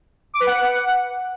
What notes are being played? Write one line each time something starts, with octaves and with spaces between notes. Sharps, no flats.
D6
B4
F#5